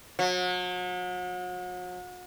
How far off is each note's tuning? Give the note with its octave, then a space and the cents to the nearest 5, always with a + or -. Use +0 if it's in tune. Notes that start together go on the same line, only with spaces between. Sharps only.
F#3 -40